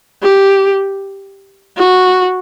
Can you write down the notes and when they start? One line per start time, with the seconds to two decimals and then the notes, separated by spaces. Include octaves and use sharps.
0.23 G4
1.77 F#4